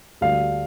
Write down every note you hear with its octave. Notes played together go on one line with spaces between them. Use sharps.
D2 D3 G3 D4 F5